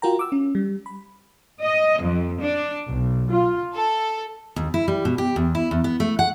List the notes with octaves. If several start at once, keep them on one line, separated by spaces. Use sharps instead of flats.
F4 F#4 A#4 G5 A#5
D6 E6
C#4
G3
B5
D#5
F2
D4
B1
F4
A4
D#2
E4
G3
B2
G4
E2
E4
E2
B3
A3
F#5